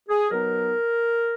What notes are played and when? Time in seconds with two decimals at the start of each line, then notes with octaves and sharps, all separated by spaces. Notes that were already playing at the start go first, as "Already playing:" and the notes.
0.09 G#4
0.30 B2 F#3 B3 D#4 A#4